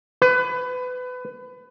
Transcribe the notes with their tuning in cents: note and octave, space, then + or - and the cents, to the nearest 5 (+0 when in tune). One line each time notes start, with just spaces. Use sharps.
B4 +25